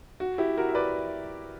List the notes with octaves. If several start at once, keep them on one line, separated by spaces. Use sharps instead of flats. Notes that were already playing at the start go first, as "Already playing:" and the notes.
F#4
E4 G4
F#4 A#4
E5
B4 D5